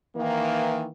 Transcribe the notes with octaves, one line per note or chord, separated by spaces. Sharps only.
D#3 E3 A#3